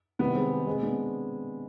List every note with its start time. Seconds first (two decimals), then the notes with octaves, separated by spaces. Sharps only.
0.19 C3 D#3 G3 B3
0.35 G#3 C4
0.51 G#3
0.67 B2 G#3 C4
0.83 B3 D4